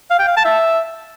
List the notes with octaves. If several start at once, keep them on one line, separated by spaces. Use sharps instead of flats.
F5
G5
F5
A5
E5